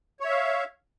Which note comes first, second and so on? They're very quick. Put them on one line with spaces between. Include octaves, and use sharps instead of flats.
C#5 E5 F5